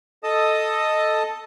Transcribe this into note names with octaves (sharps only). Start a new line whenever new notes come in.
A4 D#5 A5 D#6